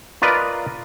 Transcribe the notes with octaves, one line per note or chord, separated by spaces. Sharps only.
F4 A#4 B4 D5 D#5